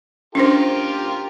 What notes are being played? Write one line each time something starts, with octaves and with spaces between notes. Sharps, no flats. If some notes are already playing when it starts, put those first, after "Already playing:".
C#4 D4 F4 G4 A#4 C5